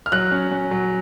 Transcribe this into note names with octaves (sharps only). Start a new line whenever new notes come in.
F6
F#3 F#6
C#4
C#4
F#3